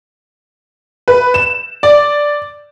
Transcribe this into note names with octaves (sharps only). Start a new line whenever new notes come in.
B4
E7
D5